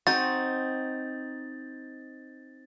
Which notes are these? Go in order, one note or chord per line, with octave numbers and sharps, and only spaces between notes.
C4 D#4 F#4 A6